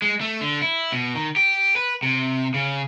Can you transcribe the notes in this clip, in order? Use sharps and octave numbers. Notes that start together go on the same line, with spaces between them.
G#3
A3
D3
E4
B2
D#3
G4
B4
C3
C#3